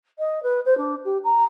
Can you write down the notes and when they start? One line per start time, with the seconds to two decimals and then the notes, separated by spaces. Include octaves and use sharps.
0.19 D#5
0.43 B4
0.65 C5
0.77 D4
1.04 G4
1.24 A#5